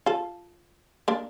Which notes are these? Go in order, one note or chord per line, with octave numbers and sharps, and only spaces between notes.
F4 A4
A#3 D4